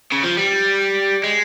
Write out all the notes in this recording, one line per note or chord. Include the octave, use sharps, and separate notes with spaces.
C#3
F3
G3
G#3